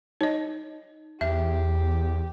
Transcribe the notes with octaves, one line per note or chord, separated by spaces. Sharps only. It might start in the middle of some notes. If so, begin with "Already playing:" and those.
D#4 C#5 D#5
E2 G4 E5